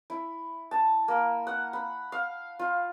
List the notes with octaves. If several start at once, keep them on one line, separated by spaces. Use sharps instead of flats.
E4
A5
A#3
F#5
B5
F5
F4